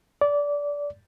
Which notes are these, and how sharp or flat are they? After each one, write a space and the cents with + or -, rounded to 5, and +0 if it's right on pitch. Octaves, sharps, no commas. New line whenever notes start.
D5 -20